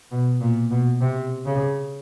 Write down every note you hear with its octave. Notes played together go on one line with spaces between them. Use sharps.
B2
A#2
B2
C3
C#3